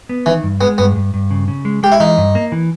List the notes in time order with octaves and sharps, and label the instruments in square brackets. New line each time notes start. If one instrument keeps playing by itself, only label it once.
[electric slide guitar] B3
[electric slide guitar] D#3 [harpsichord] E3
[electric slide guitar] G2
[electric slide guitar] G#3 [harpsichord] B3
[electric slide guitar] G2 [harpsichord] B3
[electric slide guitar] G2
G2
C#3
C#3
G#3
[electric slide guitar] G#3 [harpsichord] G4
[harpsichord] E4
[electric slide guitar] E3 [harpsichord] D#4
[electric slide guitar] G2
A#3
E3